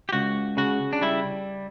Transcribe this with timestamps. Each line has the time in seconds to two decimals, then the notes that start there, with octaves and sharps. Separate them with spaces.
0.09 G4
0.13 C#2 F#4
0.57 C#3 F#4
0.93 D4
1.01 G3 E4